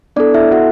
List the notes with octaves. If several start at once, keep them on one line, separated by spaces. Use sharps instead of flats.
B3 D4 E4 A4 D5
E4 E5
F#4 F#5